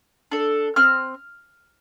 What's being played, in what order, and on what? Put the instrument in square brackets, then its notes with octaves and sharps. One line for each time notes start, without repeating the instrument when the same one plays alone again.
[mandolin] D4 A4
C4 F6